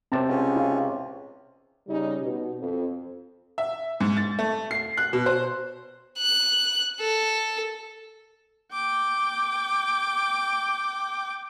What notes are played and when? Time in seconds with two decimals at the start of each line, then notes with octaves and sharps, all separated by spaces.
0.12 C3 C4 C5 A5
0.29 C#2 C#4
0.56 E4 F5
1.87 C#3 G3 C#4 D#4
2.21 B2
2.59 F2
3.58 E5
4.00 G#2
4.17 A6
4.39 A3
4.71 C7
4.98 F#6
5.13 B2
5.26 C5
6.18 F#6
7.00 A4
8.73 G5 D6